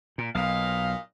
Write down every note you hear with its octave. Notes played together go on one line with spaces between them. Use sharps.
A#2
B1 A#2 D#5 F5